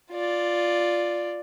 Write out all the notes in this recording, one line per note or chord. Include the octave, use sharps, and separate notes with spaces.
F4 D5